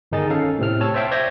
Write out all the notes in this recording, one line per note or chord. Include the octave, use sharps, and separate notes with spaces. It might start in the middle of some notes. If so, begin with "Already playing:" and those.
G1 D#3 D#4 G#4 A6
C#4 A4 F5
A2 C3 C4 F6
C#5 A5 E6
C5 C#5 E5 F5 G5 A5
C5 D5 E5 G6 G#6 A#6